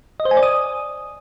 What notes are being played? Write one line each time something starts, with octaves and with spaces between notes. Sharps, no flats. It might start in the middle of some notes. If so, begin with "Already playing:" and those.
D#5
C5
G#5
D5
D#6